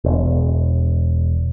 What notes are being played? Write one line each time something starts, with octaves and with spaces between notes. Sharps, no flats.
E1